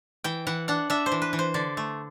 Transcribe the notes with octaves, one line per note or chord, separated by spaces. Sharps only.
E3 G5
E3 F#5
D4 F#5
D4 E5
C5
E3
B4
E3
C5
D3 D5
A3